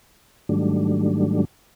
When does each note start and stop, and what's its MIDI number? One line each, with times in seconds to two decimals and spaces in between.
0.49 1.45 44
0.49 1.45 51
0.49 1.45 54
0.49 1.45 55
0.49 1.45 57
0.49 1.45 62